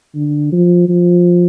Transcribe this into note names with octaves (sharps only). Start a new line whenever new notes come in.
D3
F3
F3